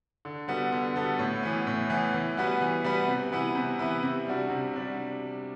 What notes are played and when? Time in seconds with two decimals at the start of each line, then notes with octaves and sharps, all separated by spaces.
0.25 D3
0.48 G3 B3 F#4 A4
0.72 D3
0.96 G3 B3 F#4 A4
1.19 A2
1.43 E3 B3
1.67 A2
1.90 E3 B3
2.14 E3
2.37 G3 B3 F#4 B4
2.61 E3
2.84 G3 B3 F#4 B4
3.08 C3
3.32 E3 B3 E4 B4
3.55 C3
3.79 E3 B3 E4 B4
4.02 C3
4.26 G3 D4 F#4
4.50 C3
4.74 G3 D4 F#4